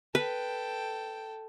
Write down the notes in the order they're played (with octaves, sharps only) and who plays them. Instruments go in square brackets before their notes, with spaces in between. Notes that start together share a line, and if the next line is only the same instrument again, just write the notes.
[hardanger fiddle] A4 G5 [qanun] B4